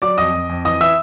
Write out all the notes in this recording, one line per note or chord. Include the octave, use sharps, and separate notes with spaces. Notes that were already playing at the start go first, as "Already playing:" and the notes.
F#3 D5 D6
F2 D#5 D#6
F2
F2
E3 D#5 D#6
E3 E5 E6